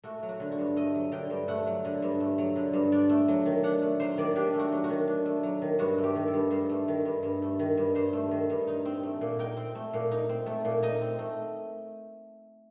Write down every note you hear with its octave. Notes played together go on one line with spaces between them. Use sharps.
A3 F#4
F#3
F#4
D3
F#4
G2
A3 D#5
F#3
D3 G5
G2
A3 F#5
F#3
D3
G2
A3
F#3
D3
G2
D4 D5
A3
F#3
D#3
D4 F#5
A3
F#3 C5
D#3 D5
D4 G4
A3
F#4
F#3
F#4
D#3
D4
A3
F#3
D#3
G2 F#4
A3
G4
D#3
A4
G2
G2 C5
A3
D#3
G2
G2
A3
D#3
G2
G2 C5
A3
D#3
G2
D#4
C4
A3
A#2
D#4 G5
C4
A3
A#2
D#4
C4
A3
A#2
D#4 D#5
C4
A3